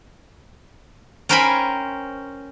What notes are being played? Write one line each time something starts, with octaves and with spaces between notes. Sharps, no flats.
C#4 A#4 C5 G5 G#5 B5